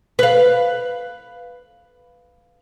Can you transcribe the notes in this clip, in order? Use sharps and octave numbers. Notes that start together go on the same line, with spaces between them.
B4 F5